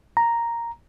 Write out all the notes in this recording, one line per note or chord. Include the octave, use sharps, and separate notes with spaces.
A#5